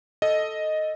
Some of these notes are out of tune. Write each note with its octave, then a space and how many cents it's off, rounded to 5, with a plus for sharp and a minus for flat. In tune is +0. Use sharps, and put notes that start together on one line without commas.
A4 +0 D#5 +0